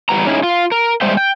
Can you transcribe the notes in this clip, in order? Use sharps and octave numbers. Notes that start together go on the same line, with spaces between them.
E2 G3 B3 A#5
C#4 D#4 E4 G#4
F4
A#4
G3 G#3 C5 E5 G5
G5